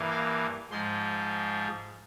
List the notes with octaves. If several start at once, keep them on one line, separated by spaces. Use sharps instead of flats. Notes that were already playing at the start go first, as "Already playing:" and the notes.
Already playing: G2 E3 A#3
F5
G#2 F3 G#3 C6